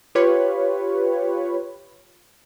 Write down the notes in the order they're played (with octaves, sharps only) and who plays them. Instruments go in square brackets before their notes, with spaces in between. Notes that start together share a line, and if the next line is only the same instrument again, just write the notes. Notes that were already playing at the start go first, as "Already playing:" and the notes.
[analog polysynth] F4 G4 B4 C#5